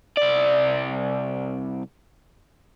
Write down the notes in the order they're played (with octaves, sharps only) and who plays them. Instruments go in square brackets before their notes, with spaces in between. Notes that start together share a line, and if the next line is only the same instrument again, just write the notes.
[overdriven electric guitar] C2 D5